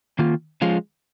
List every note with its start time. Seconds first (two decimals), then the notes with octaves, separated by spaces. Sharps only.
0.19 D#3 A#3 F4
0.62 F3 G#3 C#4 F4